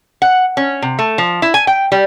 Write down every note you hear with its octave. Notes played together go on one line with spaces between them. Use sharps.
F#5
C#4
C3
A3
F3
E4
G#5
G5
G3